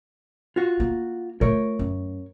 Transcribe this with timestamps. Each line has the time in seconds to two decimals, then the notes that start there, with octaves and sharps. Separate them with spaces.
0.56 F4 F#4
0.80 A#3
1.41 A3 F4 A#4 C#5
1.79 F#2